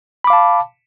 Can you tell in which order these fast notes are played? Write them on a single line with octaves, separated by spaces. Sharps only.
B5 D6 F5 A5